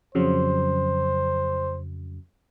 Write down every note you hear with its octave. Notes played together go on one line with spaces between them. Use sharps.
F2 C#3 F#3 C5